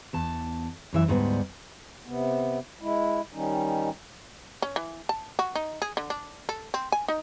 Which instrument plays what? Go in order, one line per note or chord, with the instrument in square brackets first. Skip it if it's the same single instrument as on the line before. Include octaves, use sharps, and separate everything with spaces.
[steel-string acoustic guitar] E2 A5
F#2 E3 E5
D2 G#2 G3 B3
[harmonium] C3 B3
G#3 E4
D#3 G3 C#4 D#4
[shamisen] C#4
E3
A5
F#4
D#4
G#4
D3
D4
A4
C4
G#5
D#4